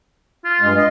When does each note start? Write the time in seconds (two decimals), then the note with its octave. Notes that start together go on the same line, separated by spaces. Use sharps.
0.45 F4
0.61 G2 G#3
0.77 D#5